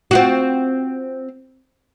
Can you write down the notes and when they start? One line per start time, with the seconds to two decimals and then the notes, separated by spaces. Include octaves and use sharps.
0.11 C4 F4 F#4